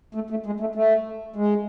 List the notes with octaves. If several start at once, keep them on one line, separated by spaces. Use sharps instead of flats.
A3
A3
G#3
A3
A3
G#3